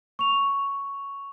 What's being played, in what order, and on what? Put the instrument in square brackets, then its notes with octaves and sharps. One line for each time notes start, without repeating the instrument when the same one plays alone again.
[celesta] C#6 F7